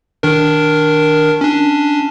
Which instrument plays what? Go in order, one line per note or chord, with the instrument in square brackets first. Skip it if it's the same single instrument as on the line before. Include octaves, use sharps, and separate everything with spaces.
[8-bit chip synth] D#3 D4 A#4
C#4 D4